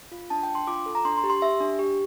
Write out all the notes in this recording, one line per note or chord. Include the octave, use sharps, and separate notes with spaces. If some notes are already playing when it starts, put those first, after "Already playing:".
F4
D4 A5
G5
D4
C6
F4 D6
A4
A#5
D4 C6
C6
G4
C6
G4 E5
D4
G4